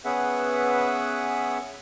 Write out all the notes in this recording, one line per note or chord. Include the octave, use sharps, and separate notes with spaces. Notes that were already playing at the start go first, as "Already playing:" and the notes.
B3 C#4 G#4 B4 E5 F#5